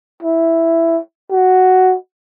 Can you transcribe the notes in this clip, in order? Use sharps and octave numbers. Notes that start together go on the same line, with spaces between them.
E4
F#4